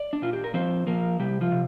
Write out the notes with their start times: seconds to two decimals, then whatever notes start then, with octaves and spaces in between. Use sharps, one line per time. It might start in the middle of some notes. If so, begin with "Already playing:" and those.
Already playing: D5
0.13 D4
0.22 A#2 F4
0.33 G4
0.44 A#4
0.54 F3 C4 C5
0.87 F3 A#3 A#4
1.19 C3 G3 G4
1.41 F3 F4
1.52 C3